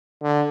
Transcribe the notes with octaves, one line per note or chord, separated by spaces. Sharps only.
D3